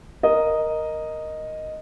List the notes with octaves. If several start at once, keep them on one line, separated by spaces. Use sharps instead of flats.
A#4 D#5 D#6